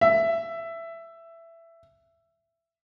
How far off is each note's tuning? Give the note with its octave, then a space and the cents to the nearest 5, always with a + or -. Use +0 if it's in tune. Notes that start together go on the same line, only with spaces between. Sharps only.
E5 +15